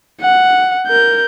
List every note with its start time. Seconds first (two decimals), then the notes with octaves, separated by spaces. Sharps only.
0.21 F#5
0.87 A#4 G6